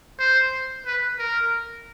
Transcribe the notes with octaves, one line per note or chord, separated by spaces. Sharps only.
C5
B4
A#4